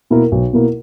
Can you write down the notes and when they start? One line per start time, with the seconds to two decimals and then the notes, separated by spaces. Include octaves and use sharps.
0.10 B2 A#3 E4 A#4
0.32 B1
0.53 B2 A#3 E4 A#4